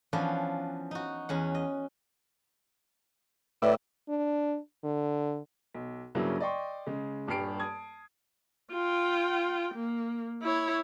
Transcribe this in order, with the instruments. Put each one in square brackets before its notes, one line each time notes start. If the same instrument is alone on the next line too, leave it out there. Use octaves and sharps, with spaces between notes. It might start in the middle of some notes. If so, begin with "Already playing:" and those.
[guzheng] E3 F3 B3 C#4 D4
D#4 F#4
E2 C#4 F#5
D#5
[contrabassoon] A2 [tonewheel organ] B4 D5 E5
[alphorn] D4
D3
[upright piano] B1
G2 C#3 F#3 A#3 C#4 E4
D5 D#5 G5 C6 C#6
C#3 G#3
D#1 G2 G4 F6 C7 D7
A5 D#6 G#6
[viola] F4 G5
A#3
E4 C#5